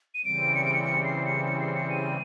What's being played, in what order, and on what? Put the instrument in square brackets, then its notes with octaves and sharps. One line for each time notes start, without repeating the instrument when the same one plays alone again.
[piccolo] D#7
[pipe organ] C#3 E3 G3 C4 [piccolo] D7
[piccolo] C#7
D7
C#7
C#7
C7
C#7
C#7
C7
C#7
D#7